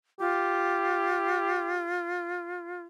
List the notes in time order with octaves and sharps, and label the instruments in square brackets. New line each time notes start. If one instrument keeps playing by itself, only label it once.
[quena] F4 [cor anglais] G4